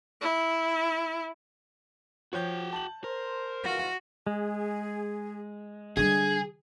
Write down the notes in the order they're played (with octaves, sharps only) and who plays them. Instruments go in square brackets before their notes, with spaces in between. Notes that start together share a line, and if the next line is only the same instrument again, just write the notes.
[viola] E4
[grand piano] F3 C#5 G6 [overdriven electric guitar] F#4 G5
[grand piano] A5 F#7
[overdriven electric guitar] A#4 [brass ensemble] C5
[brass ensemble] C#3 E3 F4 [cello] F#4
[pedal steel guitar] G#3 [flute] G#4
[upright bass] D3 G3 [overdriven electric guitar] G#4 [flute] G#6